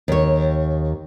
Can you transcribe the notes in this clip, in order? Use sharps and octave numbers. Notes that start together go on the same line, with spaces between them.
D#2 C#5